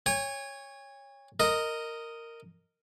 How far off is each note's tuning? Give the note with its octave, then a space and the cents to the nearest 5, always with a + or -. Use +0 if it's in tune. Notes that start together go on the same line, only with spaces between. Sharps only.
C#5 +0 G#5 -45
A#4 -10 D#5 +0